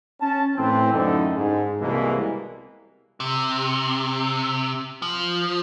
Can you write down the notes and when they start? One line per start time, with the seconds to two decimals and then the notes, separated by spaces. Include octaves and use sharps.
0.21 C#4 A5
0.56 A2 E3 C4
0.93 F#2 A2 D3 A3 D#4
1.35 G#2
1.80 C2 B2 E3 G#3 A#3
3.20 C3
5.02 F3